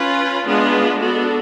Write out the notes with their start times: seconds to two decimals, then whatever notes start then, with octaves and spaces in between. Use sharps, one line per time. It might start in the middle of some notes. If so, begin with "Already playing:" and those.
Already playing: C#4 F4 B4
0.47 G#3 B3 D4 F4 B4
1.00 B3 D4 F#4 A4